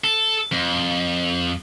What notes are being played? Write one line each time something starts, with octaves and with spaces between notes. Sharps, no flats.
A4
F2